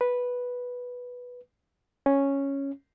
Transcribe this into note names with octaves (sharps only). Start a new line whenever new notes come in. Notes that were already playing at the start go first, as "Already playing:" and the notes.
B4
C#4